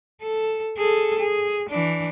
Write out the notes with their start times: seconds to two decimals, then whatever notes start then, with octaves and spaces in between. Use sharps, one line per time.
0.22 A4
0.77 G#4 A4
1.19 G#4
1.69 E3 D4